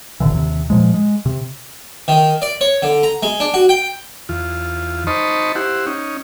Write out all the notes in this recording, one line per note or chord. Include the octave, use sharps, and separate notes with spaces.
G1 A#2 D3 E3
D#2 C3
A#2 F3 G#3
G#3
C3
D#3
D5
C#5
D3
A#5
G#3
D4
F#4
G5
E2 F4
D#4 C5 D#5 A5 B5 C#6
E4 G4 C5 F#5
C#4 D#4